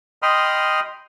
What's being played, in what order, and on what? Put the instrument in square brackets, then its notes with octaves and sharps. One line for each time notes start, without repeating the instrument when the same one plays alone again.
[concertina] D#5 G5 B5 C6 D#6 F6